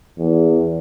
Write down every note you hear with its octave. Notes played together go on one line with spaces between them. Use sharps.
E2